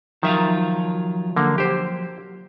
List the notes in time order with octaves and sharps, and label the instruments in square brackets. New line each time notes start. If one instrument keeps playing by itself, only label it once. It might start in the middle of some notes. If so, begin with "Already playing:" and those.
[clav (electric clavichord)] D#3 E5 [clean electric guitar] F3 F#3 F4
[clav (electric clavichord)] D3 A#3
G4 C5